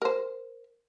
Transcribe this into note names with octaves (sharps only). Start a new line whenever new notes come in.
A#4 C5